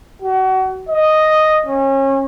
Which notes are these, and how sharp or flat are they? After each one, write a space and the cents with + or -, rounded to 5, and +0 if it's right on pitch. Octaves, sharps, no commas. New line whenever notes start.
F#4 +30
D#5 +0
C#4 -30